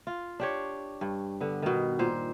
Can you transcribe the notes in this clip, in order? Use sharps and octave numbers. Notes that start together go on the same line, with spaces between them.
F4
D4 G4 C#5
G2
D3 B3
B2 D#3
A#2 C5